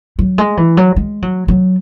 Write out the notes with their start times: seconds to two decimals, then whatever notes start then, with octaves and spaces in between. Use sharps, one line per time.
0.19 F#3
0.38 G#3
0.57 E3
0.77 F#3
0.96 G#3
1.22 F#3
1.48 F#3